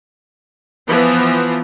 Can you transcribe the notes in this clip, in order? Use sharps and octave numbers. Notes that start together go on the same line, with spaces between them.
E3 F3 B3